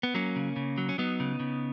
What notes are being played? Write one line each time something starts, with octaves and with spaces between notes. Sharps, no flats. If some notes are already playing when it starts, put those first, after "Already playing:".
B3
F#3 A#3 C#4
C#3
C#3
F#3
C#4
F#3 B3 D#4
C#3
C#3